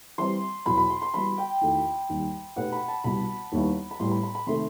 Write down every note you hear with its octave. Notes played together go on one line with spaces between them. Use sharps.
E3 G3 C4 C6
E2 B2 F#3 B5
B5
C6
C6
E3 G3 B3 F#4 B5
G5
E2 D#3 A3 D#4 F#4
D#2 D#3 G3
B2 A3 D#4 G4 B4 F#5
B5
A5
C2 B2 G3 B3 F#4 B5
D#2 D#3 G3 B3 E4
B5
A2 G3 B3 C6
B5
B5
B5
C3 D#3 A3 C6